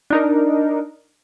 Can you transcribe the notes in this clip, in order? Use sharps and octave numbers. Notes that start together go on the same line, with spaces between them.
D4 D#4 A#4